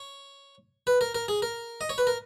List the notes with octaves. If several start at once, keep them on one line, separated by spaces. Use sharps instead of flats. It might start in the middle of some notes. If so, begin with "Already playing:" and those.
Already playing: C#5
B4
A#4
A#4
G#4
A#4
D#5
C#5
B4
A#4